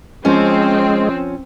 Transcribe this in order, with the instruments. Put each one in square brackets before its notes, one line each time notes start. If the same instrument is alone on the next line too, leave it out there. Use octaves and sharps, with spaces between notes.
[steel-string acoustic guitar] F3 C#4 [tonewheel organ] G#3 [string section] C4